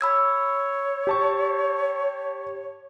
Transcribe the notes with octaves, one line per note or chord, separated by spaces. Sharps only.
C#5 B5 E6 G#6
G4 A5 C#6